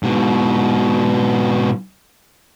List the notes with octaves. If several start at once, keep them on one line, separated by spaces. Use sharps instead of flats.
G#2 B2